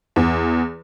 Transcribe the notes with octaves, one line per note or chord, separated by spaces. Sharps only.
E2